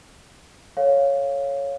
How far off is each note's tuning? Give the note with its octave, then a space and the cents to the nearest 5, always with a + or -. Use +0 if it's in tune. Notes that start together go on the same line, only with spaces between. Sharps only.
A4 +0 C#5 +0 F5 +0